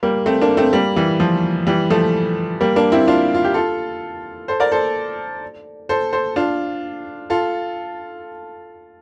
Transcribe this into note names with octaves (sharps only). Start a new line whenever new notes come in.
G3 A#3
A3 C4
A#3 D4
A3 C4
G3 A#3
E3 G3
F3
E3 G3
F3 A3
G3 A#3
A#3 D4
C4 E4
D4 F4
F4
G4
F4 A4
A4 C5
A#4 D5
A4 C5
A4 C5
A4 C5
D4 F4
F4 A4